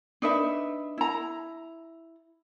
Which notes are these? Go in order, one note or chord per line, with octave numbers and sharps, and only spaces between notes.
D4 D#4 B4 E5
E4 A#5